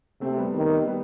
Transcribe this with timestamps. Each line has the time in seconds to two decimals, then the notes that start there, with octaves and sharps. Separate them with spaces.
0.21 C3 A3 C4
0.38 G3 B3
0.55 D#3
0.87 G3 B3